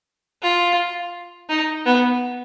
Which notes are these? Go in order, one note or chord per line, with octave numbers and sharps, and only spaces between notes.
F4
D#4
B3